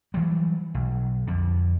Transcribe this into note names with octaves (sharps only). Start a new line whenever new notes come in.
E3 F#3 G3
B1
F2 D3